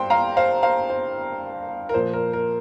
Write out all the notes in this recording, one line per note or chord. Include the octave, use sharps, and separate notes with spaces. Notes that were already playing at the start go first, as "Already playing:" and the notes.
Already playing: G2 C5 G5 C6
F5 A#5
C5 F5
C5 F5
C5
A#4
A#2 F3 C5
A#4
A#4